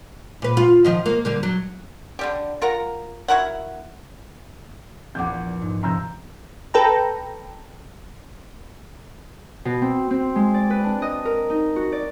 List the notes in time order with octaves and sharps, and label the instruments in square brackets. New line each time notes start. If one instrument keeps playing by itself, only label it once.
[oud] A#2 B4
F4
D#3 F3 F4
A#3
D3 G3 A#3
F#3
[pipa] D3 G3 G4
F4 A#4 F#5 A#5
E4 F#4 A#4 F#5
[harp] A#1 E2 [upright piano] F#5 D6 G6
[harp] G#2
[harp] C3 F3 [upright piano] A#5 E6 G6
[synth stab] A4 B4 G5 A#5
[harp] B2
C4
C4
G#3
D5
B4
D4
D#5
A#4
D#4
F#4
D5